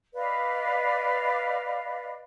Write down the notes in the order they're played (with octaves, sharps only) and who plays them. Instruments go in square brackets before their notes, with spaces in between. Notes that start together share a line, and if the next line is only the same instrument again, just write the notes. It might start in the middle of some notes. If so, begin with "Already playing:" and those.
[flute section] B4 D5 D#5 F5